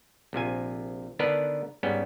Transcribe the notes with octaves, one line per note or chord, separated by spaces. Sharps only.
A#1 C3 F3 G#5
D3 D#3 B3 D4 A#4 B4
G#2 G3 B3 C#4